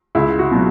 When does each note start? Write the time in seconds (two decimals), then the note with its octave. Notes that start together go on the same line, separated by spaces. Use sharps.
0.15 C#2 E4
0.39 F#4
0.52 B2 F#3